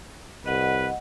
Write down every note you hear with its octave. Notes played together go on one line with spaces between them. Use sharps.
C2 B4 D#5 F#5